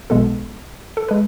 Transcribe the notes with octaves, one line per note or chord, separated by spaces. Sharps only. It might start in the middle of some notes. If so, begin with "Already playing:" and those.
B1 B2 G#3 B3 A4
A4
G#3 B4